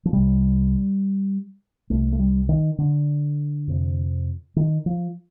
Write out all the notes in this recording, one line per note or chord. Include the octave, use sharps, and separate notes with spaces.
F3
C2 C3 G3
C2 C3 A3
A3
G3
D#3
D3
F2 C3
D#3
F3